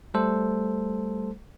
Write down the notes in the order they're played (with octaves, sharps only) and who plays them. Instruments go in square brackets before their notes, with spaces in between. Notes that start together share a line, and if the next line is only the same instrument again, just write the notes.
[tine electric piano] G3 A3 A4 C5